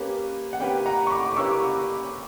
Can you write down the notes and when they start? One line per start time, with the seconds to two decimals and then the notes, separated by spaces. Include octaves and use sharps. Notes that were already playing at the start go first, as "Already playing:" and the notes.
Already playing: A#3 C#4 G4 B4
0.53 F#5
0.60 A#3 C#4 G4 B4 G5
0.86 F#5 A#5
1.07 C#6
1.11 B5 D6
1.25 D6
1.36 A#3 C#4 G4 B4 C#6 E6